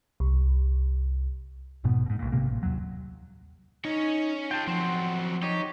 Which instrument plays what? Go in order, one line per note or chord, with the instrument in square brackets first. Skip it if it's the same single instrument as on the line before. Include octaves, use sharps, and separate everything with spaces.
[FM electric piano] C2
[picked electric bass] F1 G#2 B2 B3
G#2 B2
B1 A#2
G#1 C3 A#3
A1
D#2 F#3
[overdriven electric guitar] C#4 C#5 [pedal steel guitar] D#4
[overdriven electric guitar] F4 G#4 [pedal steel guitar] G5 A5
[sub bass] F3 [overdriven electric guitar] F#3 C4 [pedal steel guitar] F#5 C6
[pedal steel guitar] D#4 C#5 [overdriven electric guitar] G4